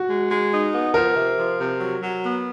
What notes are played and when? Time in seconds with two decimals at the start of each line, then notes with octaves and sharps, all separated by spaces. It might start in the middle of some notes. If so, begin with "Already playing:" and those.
Already playing: F#4
0.08 G#3
0.30 G#3
0.51 D#4
0.72 B3
0.94 F3 A#4
1.16 C3
1.37 F3
1.59 C3
1.80 F#3
2.02 F#3
2.23 B3